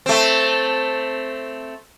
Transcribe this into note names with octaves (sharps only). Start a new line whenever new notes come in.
A3 C4